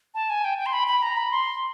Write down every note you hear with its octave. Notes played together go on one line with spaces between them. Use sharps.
A5
G#5
G5
G5
C6
B5
B5
A#5
B5
C6